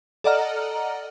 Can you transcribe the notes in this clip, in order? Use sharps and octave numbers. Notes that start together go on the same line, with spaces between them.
A4 D5 D#5 F#5 A#5 F6